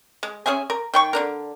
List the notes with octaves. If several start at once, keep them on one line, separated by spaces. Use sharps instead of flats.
G#3
C#4 G#4 E5 G#5
A#4
D#3 G5 C#6
D3 D4 A#4